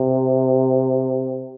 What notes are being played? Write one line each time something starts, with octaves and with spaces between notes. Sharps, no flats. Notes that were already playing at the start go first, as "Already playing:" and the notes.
Already playing: C3